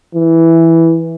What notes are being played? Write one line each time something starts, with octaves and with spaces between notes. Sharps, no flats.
E3